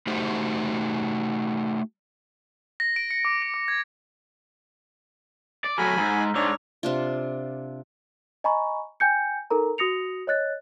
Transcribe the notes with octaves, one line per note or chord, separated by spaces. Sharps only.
A3 D#4 F#4 G4 C5
A#6
D7
C#7
D6
D7
D6
G#6
D5
F#3 A3 G#5 B5 F6
G#2 A#5 E6
G#2 D4 C#5 D6 E6 F7
C3 D4 F4
D#5 G#5 A#5 B5 C#6
G5 G#5 G6 C#7
D#4 A4 A#4 A#5
F#4 D#6 A#6 C#7 F7
C#5 D#5 F#6 A6